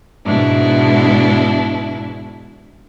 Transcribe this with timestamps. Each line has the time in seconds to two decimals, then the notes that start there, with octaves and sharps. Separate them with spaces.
0.25 G#2 B2 D4 E4